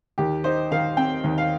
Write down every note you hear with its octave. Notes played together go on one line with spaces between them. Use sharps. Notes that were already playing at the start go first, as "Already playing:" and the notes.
D#2 G4
D#4 C5
D#3 F5
C4 G5
D#2
F5